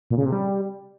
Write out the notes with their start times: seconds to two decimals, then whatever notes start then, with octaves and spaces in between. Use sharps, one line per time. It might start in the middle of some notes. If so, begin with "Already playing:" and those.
0.10 A#2
0.18 C#3
0.25 C3
0.32 G3